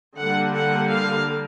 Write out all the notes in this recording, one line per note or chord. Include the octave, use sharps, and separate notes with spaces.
D3 G3 A#3 F#5
F#5
F5